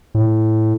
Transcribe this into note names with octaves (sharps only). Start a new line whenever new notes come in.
A2